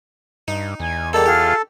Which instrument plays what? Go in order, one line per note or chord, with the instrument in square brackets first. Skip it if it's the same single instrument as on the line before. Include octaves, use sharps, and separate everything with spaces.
[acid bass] G2 [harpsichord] D#4
[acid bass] E2 [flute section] G#5
[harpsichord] G3 G#3 A#3 [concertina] A4
[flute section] F4 G#4 F6 [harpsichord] G4